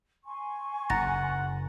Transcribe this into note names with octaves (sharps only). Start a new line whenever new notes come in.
G#5 C6 C#6
F#1 F#2 F#5 A#5 A6 A#6